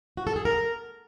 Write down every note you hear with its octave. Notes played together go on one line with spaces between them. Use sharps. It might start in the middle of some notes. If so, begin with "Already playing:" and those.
F#4
A4
G#4
A#4